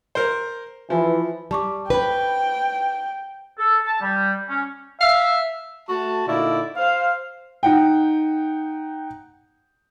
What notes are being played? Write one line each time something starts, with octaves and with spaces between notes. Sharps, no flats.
A#4 C5
E3 F3
G3 A5 C#6 D6
B4 C5 G5 B5
A4
A5
G3
C#4
E5 F5
A3 F#4 A5
A#2 D3 D#4 E4 D5 F5
C5 F5
D#4 F#5 G5